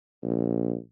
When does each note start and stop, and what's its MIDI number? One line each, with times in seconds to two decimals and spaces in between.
0.23 0.76 34